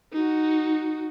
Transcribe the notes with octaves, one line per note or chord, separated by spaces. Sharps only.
D#4 F#4